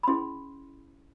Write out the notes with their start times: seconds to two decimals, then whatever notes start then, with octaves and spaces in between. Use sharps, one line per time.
0.03 B5
0.07 C#4 E4 G#4 C6